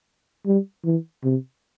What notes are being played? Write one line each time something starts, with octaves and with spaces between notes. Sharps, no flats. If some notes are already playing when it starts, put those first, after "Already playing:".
G3
E3
C3